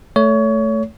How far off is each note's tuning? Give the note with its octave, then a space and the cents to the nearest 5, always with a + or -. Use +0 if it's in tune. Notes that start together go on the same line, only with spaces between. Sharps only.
A3 +0 C#5 +25